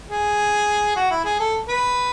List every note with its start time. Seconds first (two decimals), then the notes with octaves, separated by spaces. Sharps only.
0.09 G#4
0.96 F#4
1.11 E4
1.24 G#4
1.40 A4
1.68 B4